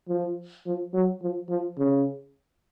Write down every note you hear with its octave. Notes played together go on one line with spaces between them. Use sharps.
F3
F3
F#3
F3
F3
C#3